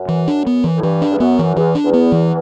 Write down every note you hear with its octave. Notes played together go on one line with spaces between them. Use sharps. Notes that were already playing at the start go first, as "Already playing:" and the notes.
Already playing: F#2
E3
D4
B3
E3
A2
G2 E3
D4
E2
F#2 B3
E3
E2 E3
D4
E2
B3
E3